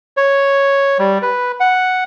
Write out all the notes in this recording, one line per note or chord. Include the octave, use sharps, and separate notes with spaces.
C#5
G3
B4
F#5